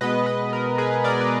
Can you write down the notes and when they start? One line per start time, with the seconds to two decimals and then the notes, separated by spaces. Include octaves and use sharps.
0.01 B2 G#3 B3 B4 D#5
0.26 B4 D#5
0.53 A#4
0.78 G#4 B4
1.04 A#4 D5
1.20 B4